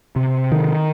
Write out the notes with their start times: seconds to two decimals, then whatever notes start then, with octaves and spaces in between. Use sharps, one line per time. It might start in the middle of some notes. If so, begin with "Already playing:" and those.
0.16 C3
0.52 D#3